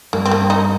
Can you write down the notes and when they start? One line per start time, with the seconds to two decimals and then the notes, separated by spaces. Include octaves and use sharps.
0.13 G2 A#3
0.26 C4
0.31 A#3
0.50 D#4